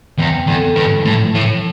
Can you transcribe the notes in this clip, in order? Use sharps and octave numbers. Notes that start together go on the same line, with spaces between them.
E2 C4
E2 D3
G2 E3
A2 F3
A2